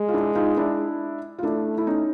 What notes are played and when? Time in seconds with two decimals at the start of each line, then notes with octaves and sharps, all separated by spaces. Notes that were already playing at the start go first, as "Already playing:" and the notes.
Already playing: G#3
0.08 F4
0.14 D4 E4
0.35 D#4 F4
0.57 D4 E4
1.39 F4
1.43 A3 D4 E4
1.78 E4
1.87 C#4 D#4